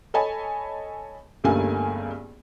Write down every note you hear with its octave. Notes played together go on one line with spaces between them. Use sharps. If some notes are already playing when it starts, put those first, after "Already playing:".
A4 C#5 D#5 G#5 A5 B5
G1 C#2 G2 A3 A#3 G#5